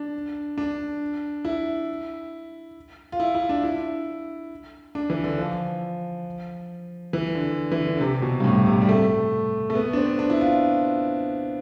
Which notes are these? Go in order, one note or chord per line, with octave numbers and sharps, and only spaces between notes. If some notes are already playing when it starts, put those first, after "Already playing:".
Already playing: D4
D4
E4
F4
E4
E4
D4
E4
D4
E3
D3
F3
E3
D3
E3
D3
D3
C3
B2
G2
A2
C3
G3
A3
A3
B3
D4
C4
D4
E4
F4